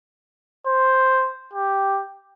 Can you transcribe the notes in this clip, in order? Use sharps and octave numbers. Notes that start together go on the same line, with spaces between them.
C5
G4